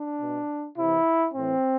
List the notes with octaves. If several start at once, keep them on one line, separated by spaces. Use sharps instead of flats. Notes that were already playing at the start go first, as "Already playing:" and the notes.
Already playing: D4
B2
C3 E3 E4
A2 E3 C4